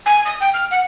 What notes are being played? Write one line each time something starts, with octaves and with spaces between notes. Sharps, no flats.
G#5
D#6
G5
F6
F#5